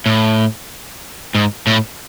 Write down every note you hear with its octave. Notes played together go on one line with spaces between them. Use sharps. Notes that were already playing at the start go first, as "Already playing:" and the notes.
A2
G#2
A2